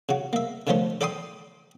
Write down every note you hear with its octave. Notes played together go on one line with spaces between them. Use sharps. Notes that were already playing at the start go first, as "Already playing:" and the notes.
C#3 F#4
A#3 E5
D3 D#3 F3 A3 C#4 C5
A4 D5 G5 B5 C6 D#6